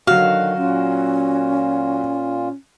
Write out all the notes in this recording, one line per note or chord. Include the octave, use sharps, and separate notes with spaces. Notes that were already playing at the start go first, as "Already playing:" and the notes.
D3 D#3 F#3 F#4 F5
A#2 C#4 F4